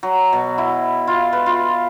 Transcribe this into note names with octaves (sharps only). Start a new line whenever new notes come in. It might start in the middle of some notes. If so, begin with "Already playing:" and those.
F#3
B2
E4
F4
B4
F4